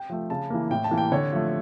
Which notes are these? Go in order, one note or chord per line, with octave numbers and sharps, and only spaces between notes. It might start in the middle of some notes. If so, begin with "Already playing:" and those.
Already playing: G5
F3 A3
C#3 A5
E3 A#3
A2 G5
A5
E3 A#3
G5
D3 C#5
F3 A3